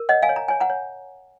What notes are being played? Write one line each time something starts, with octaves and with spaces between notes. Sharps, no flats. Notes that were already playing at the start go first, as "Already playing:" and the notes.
Already playing: A#4
C#5 D#5 F#5
F5 G#5
C#5
A#5
C#5 G#5
F#5 A#5
C#5